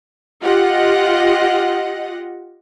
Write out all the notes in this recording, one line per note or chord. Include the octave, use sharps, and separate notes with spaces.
F4 G4 D#5 F#5